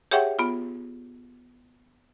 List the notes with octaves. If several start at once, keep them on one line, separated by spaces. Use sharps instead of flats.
G4 G#4 C#5 E5 F#5 G5
B3 F4